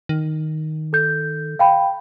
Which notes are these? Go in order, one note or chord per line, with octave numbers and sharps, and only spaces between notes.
D#3
A4 G6
F5 G5 B5